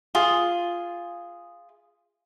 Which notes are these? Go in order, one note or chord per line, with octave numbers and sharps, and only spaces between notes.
F4 G#4